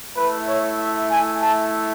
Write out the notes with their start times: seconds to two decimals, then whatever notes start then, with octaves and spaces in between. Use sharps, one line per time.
0.16 A3 E4 B4
0.48 C#5
0.79 E5
1.10 G#5
1.41 A5